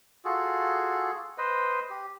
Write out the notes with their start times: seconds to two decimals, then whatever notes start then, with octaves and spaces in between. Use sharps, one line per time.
0.25 F4 F#4 G#4 A4
1.38 B4 C5 D#5
1.90 G4